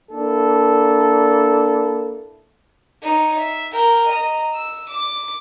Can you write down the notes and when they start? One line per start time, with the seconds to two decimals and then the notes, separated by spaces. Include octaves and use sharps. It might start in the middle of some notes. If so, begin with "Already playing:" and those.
0.11 A#3 D4 E4 A4
3.02 D#4 C#5
3.38 E5
3.71 A#4 G5
4.06 D#5 A#5
4.53 E6
4.89 D6